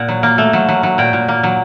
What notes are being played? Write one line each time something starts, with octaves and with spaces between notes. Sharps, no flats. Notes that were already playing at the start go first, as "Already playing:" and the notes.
Already playing: A#2 F#5
F#3
A#3
A3
F#3
F#3
F#3
A#2 G5
A#2
A#3
F#3